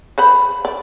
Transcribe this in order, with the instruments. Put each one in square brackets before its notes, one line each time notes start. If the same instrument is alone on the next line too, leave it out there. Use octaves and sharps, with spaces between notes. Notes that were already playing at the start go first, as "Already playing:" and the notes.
[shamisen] B4 C5 B5
D5